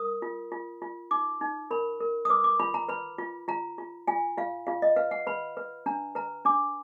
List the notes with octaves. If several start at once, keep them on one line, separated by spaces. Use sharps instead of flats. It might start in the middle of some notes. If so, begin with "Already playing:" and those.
Already playing: A#4 D#6
F4
F4
F4
D#4 D6
D#4
A#4 B5
A#4
D#6
B4 D6
D6
F4 B5
A#5
B4 B5
F4
F4 A#5
F4
F4 G#5
F4 F5
F4 F5
D#5
B4 F5
F#5
B4 B5
B4
D4 A#5
B4 A#5
D4 D6